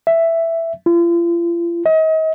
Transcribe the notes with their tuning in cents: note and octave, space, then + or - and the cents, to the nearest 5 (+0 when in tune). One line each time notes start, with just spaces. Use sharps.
E5 +5
F4 -40
D#5 +35